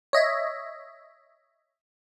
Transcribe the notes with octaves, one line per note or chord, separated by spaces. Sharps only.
C#5 D#5 E5